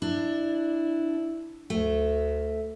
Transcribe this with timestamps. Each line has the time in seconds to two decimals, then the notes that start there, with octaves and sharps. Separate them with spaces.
0.02 D4 E4
1.70 D2 A3